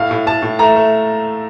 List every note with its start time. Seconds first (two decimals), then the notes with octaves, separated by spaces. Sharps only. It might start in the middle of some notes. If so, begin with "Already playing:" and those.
Already playing: A2 F5
0.11 A2
0.26 A2 A5
0.42 A2
0.59 A3 A#5
0.76 A3